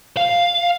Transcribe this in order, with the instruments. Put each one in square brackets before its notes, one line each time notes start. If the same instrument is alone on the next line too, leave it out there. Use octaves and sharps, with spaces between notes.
[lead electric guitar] F5